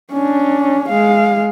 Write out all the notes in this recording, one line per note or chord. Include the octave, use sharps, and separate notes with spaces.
C#4 D4
G#3 F5